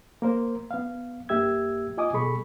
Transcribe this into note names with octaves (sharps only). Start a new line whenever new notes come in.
A#3 A#4 C5
B3 F5
G2 A#3 G4 E5 E6 G#6
F4 D#5 G#5 D6 D#6
B2 G3 G#4 A4 B5 C#6